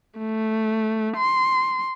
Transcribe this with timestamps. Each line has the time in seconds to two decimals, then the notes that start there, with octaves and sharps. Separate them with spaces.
0.18 A3
1.17 C6